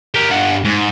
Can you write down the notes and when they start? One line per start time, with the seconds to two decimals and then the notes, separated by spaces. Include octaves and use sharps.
0.15 G4 A#4
0.30 G2 F#5
0.65 G#2